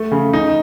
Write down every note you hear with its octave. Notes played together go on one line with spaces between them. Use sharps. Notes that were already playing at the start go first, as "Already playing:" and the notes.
Already playing: A3
C#3
D#4